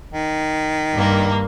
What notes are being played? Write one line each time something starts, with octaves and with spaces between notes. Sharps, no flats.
D#3
G2 A#3